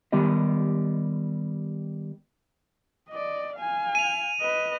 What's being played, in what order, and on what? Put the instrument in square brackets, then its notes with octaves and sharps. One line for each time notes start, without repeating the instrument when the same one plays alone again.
[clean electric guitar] D#3 G3 B3 G4 D#5
[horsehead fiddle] D5 D#5
F5 G#5
[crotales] D#7 F7
[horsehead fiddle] B4 D#5